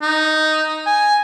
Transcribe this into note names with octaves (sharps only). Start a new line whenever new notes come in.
D#4
G#5